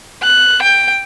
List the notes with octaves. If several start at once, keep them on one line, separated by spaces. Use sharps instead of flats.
F#6
G5